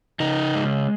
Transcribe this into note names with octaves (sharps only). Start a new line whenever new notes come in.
C#3 D#4
G#3